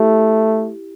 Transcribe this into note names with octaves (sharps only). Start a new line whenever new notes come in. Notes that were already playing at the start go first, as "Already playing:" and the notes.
Already playing: A3 E4 G4